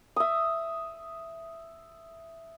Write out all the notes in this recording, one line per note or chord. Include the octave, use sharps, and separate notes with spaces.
E5 D#6